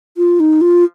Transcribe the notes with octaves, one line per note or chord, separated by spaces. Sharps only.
F4
D#4
F4